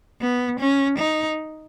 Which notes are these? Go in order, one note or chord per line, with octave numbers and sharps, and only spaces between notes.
B3
C#4
D#4